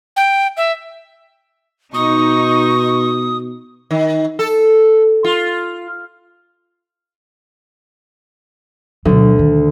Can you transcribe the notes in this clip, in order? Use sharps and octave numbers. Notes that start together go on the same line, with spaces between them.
G5
E5
B2 D#4 C#6 D#6
D#3
A4
F4
D2 B2 F#3
D#3